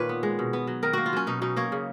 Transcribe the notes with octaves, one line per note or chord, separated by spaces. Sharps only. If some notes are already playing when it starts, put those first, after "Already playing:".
Already playing: A#2 D#3 B4 C#5 F5
B3
G#3
B2
B3
F#3
D#3 A#4
A#3 F#4
F4
F#3 C#4
B2 D#4
B2 D#4
A#3 C#5
C#3